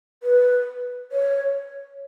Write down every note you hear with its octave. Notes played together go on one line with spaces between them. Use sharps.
B4
C#5